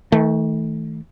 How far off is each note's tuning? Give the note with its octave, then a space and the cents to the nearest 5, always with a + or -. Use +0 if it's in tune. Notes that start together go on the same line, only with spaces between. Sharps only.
D#3 +45 A3 +0